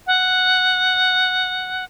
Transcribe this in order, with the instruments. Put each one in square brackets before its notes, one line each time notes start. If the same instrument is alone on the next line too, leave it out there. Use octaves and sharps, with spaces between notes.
[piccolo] F#5